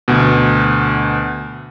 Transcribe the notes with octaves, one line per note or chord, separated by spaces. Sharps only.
D2 B2